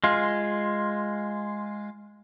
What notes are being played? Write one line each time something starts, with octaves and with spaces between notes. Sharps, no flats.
G#3 F4